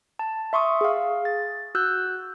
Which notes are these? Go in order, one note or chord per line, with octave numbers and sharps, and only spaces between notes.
A5
E5 C6 C#6 D#6
G#4 F5
A6
F#4 E6 F#6 G6